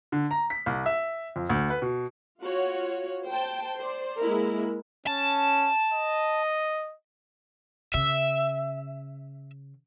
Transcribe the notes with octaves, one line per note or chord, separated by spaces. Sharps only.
D3
A#5
B6
C2
E5
F2
D2
B4
B2
F4 F#4 C#5
C5 G5 A5
C5 D5
G#3 A#3 E4 A#4
C#4 A5
D#5
C#3 E5